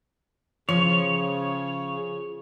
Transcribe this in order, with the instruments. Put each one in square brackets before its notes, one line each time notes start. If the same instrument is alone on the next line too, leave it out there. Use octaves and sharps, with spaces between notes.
[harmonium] C#3 [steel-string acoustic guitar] F3 [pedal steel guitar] C#5